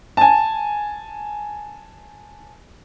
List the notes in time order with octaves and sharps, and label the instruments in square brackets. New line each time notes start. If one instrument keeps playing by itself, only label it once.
[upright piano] G#5 A5